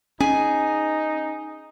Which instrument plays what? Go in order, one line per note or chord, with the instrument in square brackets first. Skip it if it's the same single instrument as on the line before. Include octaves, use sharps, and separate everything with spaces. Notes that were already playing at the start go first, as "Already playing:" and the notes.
[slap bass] C#4 [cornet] D#4 [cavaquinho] G#4